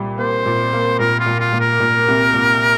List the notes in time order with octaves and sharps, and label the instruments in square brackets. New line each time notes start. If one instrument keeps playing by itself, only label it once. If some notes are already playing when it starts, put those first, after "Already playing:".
Already playing: [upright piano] C2 A#2 G3
[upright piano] A#3 [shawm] C5
[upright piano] A#2
A#3
[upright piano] A#2 [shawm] A#4
[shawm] F4
[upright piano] A#2
[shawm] F4
[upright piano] A#2
[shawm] A#4
[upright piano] A#2
C2
A#2